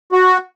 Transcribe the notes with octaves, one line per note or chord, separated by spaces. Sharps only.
F#4